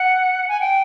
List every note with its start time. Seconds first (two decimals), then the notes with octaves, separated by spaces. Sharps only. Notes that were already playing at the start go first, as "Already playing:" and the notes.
Already playing: F#5
0.48 G#5
0.60 G5